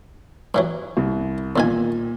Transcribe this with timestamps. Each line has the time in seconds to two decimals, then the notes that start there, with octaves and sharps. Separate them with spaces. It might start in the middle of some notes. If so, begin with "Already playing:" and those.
0.54 G2 E3 F#3
0.97 C2
1.56 E2 A#2 D#3 G#5